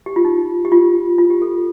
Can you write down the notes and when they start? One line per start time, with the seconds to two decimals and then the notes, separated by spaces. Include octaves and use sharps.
0.06 G4
0.16 F4
0.25 D#4
0.65 G4
0.72 F4
1.18 F4
1.30 G4
1.42 A4